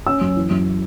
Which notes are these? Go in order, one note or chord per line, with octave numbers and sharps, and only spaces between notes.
C#4 E6
F#2
E3
F#2